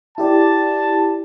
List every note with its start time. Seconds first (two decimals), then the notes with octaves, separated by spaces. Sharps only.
0.18 E4 G4 D5 A5